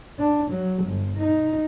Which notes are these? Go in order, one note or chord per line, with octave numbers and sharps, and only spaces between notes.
D4
F#3
G1
D#4